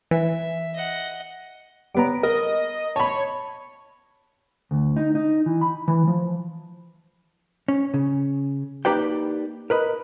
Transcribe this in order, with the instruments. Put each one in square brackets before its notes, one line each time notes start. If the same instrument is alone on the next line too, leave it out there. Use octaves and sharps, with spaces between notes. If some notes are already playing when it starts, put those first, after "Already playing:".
[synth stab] E3 [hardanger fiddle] E5
[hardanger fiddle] D#5 F#5
[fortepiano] G3 B3 A#5 [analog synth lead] D7
[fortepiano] A#4 [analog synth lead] D#5
[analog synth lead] C#5 [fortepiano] A5 B5
[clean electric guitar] D2
D#4
D#4
E3
B5
E3
F3
[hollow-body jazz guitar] C#4
C#3
A#3 D#4 G4 B4 D5 G5
A#4 B4 D#5 B5